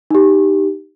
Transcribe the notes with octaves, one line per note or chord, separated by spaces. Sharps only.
D#4 G4